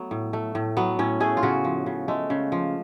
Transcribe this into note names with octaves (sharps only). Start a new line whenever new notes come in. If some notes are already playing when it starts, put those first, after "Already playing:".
Already playing: F#3 A3 B3
A2
A3
A2
F#3 B3
A2 C#4
A3 G#4
F4
C#3 F#4
F3
C#3
G#3 A3
C#3
F3